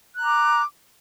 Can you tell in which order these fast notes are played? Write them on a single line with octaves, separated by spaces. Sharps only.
F#6 A#5 D6